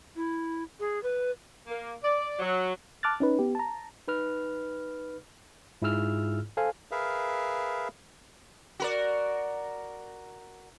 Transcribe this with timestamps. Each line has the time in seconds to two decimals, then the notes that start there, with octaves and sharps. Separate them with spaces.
0.16 E4
0.80 G#4
1.03 B4
1.67 A#3
2.03 D5
2.39 F#3
3.03 A5 D6 F6 F#6 A6
3.20 C#4 D#4 B4
3.39 B3 G4
3.55 A5 A#5
4.08 D#4 B4 F6
5.82 G#2 E4 F4 G#4 E6 F6
6.57 A4 C5 F5 G#5
6.91 G#4 A#4 B4 E5 F5
8.80 F#4 A#4 D5